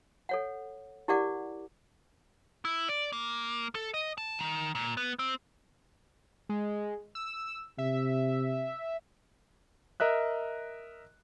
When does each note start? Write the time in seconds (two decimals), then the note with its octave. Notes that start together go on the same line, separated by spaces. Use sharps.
0.29 A4 C#5 F#5
1.08 E4 G4 A#4 D5 F#5 D6
2.65 E4
2.89 D5
3.13 A#3
3.75 A4
3.94 D#5
4.18 A5
4.39 D#3
4.75 A#2
4.97 B3
5.19 C4
6.49 G#3
7.15 E6
7.78 C3 E5
10.00 A#4 D#5 E5 F#6